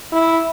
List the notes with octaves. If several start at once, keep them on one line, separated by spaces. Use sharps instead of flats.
E4